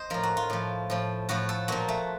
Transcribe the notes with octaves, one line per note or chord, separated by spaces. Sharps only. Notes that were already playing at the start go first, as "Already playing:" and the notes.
Already playing: C5 D#5
A2 F3 A#4
F#4
F4
A2 F3
A2 F3
A2 F3 F#4
A4
A#2 F3 F#4
A3